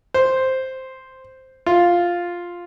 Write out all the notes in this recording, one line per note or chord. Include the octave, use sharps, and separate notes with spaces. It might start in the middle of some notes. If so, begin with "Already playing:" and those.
C5
F4